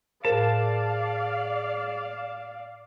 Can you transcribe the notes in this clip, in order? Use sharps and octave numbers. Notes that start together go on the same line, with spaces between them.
A2 G#4 A#4 C5 D5 F5 A5